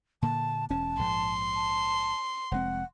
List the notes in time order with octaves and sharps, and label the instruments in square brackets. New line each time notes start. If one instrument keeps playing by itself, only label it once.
[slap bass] A#2 D3 A#3 [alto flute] A5
[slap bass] E1 C#4 [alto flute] A5
[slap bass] A#1 G#2 [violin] C6
[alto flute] A5
[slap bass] F1 G#3 C4 [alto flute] F#5